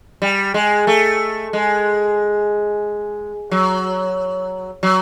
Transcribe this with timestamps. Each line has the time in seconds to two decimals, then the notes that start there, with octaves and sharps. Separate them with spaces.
0.22 G3
0.54 G#3
0.87 A3
1.53 G#3
3.51 F#3
4.83 F#3